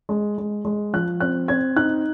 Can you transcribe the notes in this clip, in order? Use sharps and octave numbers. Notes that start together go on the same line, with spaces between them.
G#3
G#3
G#3
F3 F#6
C4 F#6
C4 G#6
D#4 F#6